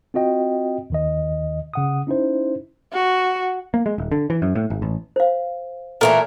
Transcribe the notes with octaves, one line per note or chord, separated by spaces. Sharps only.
C4 F4 F#4 D#5 G5
D#2 D#3 D#5
C#3 F#5 D#6
C#4 D#4 E4 C5
F#4
A#3
G#3
D#1
D3
E3
F#2
A2
G#1
A1
C5 F5
A#2 E3 A3 A4 A#4